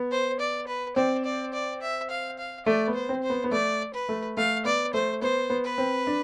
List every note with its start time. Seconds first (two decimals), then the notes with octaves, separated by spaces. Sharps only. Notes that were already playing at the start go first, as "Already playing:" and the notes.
Already playing: B3
0.11 C5
0.40 D5
0.67 B4
0.96 C4 D5
1.25 D5
1.53 D5
1.82 E5
2.10 F5
2.39 F5
2.66 A3 D5
2.88 B3
2.94 C5
3.09 C4
3.23 C5
3.30 B3
3.44 B3
3.51 A3 D5
3.94 B4
4.09 A3
4.37 A3 F5
4.65 B3 D5
4.94 A3 C5
5.22 B3 C5
5.50 B3
5.65 B4
5.78 C4
6.07 D4